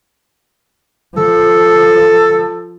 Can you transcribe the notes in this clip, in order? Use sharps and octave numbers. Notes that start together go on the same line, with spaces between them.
F3 A4